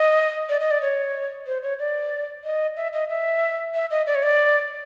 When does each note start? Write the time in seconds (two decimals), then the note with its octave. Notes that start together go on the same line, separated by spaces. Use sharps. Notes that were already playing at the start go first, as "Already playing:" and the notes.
Already playing: D#5
0.49 D5
0.60 D#5
0.71 D5
0.82 C#5
1.47 C5
1.63 C#5
1.79 D5
2.44 D#5
2.77 E5
2.93 D#5
3.09 E5
3.74 E5
3.91 D#5
4.07 D5
4.15 C#5
4.23 D5